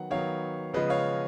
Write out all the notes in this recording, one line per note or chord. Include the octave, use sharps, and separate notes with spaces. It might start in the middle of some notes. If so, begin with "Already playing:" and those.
Already playing: D#3 F#3 B3 F#5
D#3 F#3 B3 C#5 F5
C#3 F3 G#3 B3 B4 D#5
C#5 F5